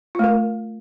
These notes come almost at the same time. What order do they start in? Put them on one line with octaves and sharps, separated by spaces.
F4 A3 A#4